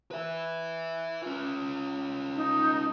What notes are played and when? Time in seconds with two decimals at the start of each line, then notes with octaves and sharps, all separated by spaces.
0.11 B4 E5
1.23 C#4 F4
2.36 D#4